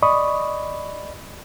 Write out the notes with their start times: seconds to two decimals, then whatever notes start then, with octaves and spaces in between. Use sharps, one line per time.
0.02 D5 D#5 B5 C#6 D#6